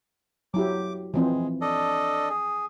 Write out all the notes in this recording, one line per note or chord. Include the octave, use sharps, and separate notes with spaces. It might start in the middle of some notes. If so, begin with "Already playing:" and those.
F#3 E4 G4 D6
E3 F3 G#3 C4
D4 A4 D#5
G#4